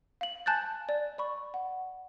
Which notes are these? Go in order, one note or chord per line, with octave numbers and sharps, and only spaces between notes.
F5 F#7
G#5 A5 F#6 G6 A6
D5
D5 B5 C#6
F#5